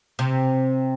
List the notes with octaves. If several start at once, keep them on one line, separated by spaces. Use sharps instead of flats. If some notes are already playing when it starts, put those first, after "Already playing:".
C3